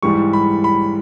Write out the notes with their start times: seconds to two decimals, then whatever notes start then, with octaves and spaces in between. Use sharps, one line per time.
0.03 G#2 E3 G3 C#6
0.33 B5
0.64 B5